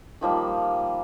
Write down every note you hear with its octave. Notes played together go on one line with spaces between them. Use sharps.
D#3 F3 G3 A#3